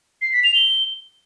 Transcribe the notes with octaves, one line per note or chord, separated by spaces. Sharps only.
C7
B6
F7
G7